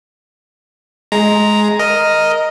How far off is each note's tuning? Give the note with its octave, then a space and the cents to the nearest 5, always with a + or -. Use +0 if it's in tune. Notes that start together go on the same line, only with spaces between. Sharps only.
G#3 +15 A#5 +0
A#4 +0 D#5 +0